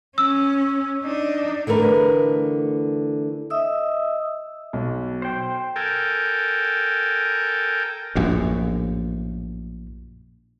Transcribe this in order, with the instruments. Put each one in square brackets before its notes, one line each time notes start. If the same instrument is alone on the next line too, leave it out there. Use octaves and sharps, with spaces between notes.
[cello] C#4 [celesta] E6
[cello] D4 D#4
[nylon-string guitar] D3 E3 A3 A#4 B4
[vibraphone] D#5 E5 D#6 E6
[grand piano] B1
[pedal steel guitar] C5 G5
[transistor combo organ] A4 A#4 G5 G#5
[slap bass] A#1 F#2 A2